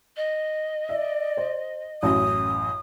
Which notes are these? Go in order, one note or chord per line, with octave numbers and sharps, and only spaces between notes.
D#5
D5 E5
C5
A1 F#2 D#6